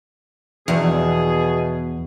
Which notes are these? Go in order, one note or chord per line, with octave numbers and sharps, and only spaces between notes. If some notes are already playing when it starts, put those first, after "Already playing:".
E2 B2 G#4